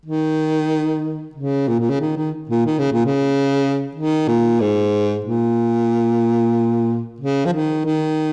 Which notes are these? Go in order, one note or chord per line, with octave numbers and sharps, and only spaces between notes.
D#3
C#3
A#2
A#2
C#3
D#3
D#3
A#2
D#3
C#3
A#2
C#3
D#3
A#2
G#2
A#2
C#3
F3
D#3
D#3